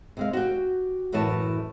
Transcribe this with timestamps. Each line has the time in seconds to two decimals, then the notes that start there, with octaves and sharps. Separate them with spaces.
0.17 C3 G#3 F5
0.33 F#4 G4
1.12 F#2 A2 E3 E4 C#5 A5